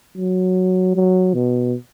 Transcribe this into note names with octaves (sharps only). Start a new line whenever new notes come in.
F#3
F#3
B2